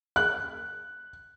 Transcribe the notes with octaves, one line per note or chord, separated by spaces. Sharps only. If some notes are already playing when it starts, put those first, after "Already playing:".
F#6